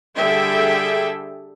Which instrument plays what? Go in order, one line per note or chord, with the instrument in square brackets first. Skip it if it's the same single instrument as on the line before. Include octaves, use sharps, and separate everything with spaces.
[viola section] D3 G3 G#4 A4 E5 G5